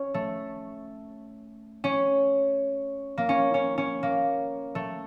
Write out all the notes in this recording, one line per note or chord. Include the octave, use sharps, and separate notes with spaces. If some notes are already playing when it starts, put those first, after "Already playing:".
Already playing: C#4
A3
C#4
A#3
C#4
C#4
C#4
A#3
A3